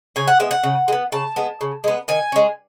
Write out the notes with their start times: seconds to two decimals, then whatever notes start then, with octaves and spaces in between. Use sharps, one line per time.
0.16 C#3 G#5
0.28 F#5
0.39 G#3 B3 E5
0.51 F#5
0.63 C#3
0.88 G#3
0.92 B3
1.12 C#3 A5
1.36 G#3 B3
1.61 C#3
1.84 G#3 B3
2.08 D#3 G#5
2.32 G#3 C#4